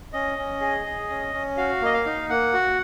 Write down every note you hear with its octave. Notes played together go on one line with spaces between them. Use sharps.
C#4 D#5
C#4
G#4
G#4
C#4
C#4
F#4 F5
A#3 D#5
F5
D#4
A#3 F#5
F#4